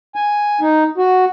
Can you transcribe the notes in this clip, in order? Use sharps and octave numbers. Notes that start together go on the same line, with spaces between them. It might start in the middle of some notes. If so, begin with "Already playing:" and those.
G#5
D#4
F#4